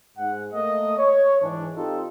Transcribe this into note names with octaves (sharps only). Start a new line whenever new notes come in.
G#2 F#5
A3 A#3 D#5
C#5
G#2 E3 D4
C4 D#4 F4 G4 A4